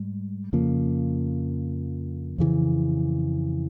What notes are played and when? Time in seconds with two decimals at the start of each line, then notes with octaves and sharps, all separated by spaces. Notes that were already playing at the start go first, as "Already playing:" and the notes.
Already playing: G#2 G3
0.53 F2 C#3 F3 A#3
2.38 F2 C#3 E3